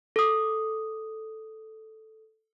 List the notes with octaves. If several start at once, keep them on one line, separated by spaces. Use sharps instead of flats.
A4 D#6